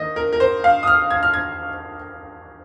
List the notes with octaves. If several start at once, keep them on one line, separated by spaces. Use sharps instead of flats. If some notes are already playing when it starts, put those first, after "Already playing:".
Already playing: D#3 A#3 D#5
A#4
A#4
C5
F5
D#6
F6
G#6
F6
G#6